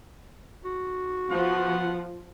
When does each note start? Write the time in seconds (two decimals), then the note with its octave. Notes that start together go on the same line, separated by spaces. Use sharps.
0.65 F#4
1.30 F3 B3 F4 F#5